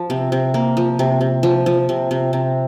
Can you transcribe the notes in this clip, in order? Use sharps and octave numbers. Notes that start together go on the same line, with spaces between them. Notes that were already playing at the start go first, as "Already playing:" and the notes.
Already playing: F3
C3
C3
A#3
F3
C3
C3
F3
F3
C3
C3
C3